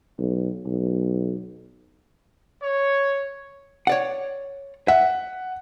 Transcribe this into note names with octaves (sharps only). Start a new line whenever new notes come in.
B1
B1
C#5
C#5 D5 F#5
E5 F#5